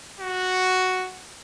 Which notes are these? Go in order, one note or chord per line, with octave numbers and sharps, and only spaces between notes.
F#4